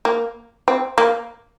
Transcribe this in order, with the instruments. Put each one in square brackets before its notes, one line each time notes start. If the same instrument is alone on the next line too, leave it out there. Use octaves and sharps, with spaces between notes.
[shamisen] A#3
C4
A#3